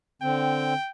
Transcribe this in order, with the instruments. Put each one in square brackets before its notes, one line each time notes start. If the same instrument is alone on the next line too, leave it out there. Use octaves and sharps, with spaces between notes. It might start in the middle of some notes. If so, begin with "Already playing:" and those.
[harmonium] D3 C4 [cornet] G5